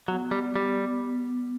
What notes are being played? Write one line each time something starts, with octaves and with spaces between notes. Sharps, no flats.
F#3 B3
G3
G3